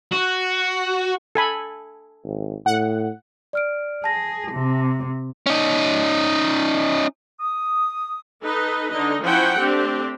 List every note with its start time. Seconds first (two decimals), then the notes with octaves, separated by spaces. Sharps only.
0.11 F#4
1.35 A4 G#5 B5
2.24 G#1
2.66 A2 F#5
3.53 D5 F6 D7
4.04 G#4 A5 A#6
4.52 C3
5.46 C#4 D#4
7.40 D#6
8.44 D#4 A4 B4 D#5
8.90 D3 D#4 D#5
9.23 F3 C#4 E4 C5 F#5 G5
9.58 A3 C4 D4 G4